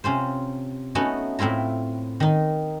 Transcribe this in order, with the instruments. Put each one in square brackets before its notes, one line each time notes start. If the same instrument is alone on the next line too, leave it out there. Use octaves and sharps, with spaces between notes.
[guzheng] C3 C#4 F4 C5
A3 B3 C#4 D#4 F#4
A2 C4 E4 F4 A#5
D#3 D#4